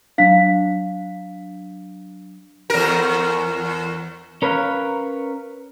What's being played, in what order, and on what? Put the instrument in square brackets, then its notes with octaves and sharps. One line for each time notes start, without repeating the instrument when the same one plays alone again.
[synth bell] F#3 D4 [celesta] F5 B6
[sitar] E2 A#4
[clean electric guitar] C#4 A#4 B4 C#5 F5